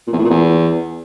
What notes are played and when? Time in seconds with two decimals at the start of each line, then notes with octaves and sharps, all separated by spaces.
0.07 A#2
0.13 E2
0.18 A2
0.24 A#2
0.30 E2